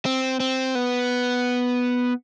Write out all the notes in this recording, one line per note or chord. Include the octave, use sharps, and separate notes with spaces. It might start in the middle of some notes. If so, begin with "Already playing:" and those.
C4
C4
B3